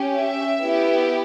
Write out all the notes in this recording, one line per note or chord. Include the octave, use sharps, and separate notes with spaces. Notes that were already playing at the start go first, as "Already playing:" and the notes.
Already playing: C#4 G4
E5
B3 E4 G4